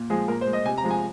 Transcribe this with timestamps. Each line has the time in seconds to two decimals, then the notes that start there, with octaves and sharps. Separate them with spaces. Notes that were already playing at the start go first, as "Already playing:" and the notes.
Already playing: A#2
0.10 F3 G#3 G#4
0.28 A#2 A#4
0.41 C5
0.47 G#3
0.53 D#5
0.65 C3 G#5
0.78 A#5
0.84 F3 G#3
0.91 G#5